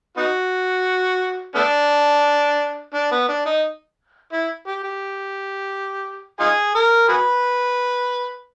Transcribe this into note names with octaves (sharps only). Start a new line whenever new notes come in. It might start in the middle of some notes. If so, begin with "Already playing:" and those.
B3 D#4 F#4
A3 B3 D4
D4
B3
D4
D#4
E4
G4
G4
D#4 F4 G#4
A#4
F#4 G#4 B4